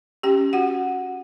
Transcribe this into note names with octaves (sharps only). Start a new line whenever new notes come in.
C#4 G4 G5
F#4 F#5